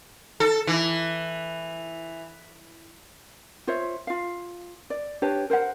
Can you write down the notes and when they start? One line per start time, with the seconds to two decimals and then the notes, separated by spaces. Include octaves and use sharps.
0.40 A4
0.67 E3
3.67 F4 C5 C#5 E5
4.07 F4 F5
4.90 D5
5.22 D4 G4 B4 C#5
5.50 A#4 C5 C#5 F#5